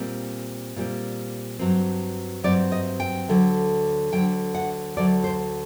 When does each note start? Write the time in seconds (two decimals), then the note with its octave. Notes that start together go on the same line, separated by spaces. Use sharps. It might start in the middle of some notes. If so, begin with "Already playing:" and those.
Already playing: A#2 G3 C4
0.76 A#2 G3 C4
1.59 G2 F#3 C4
2.43 G2 F#3 C4 D5
2.72 D#5
3.00 G5
3.28 D2 D3 F#3
4.12 D2 D3 F#3 G5
4.55 F#5
4.96 D2 D3 F#3 D5
5.24 C5